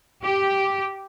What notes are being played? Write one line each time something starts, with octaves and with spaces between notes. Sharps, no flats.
G4